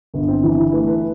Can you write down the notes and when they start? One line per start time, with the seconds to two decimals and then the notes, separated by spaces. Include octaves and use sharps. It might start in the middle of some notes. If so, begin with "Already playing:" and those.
0.14 G1 B3
0.28 C4
0.42 E3 E4
0.58 E4
0.72 A3 B4
0.88 B4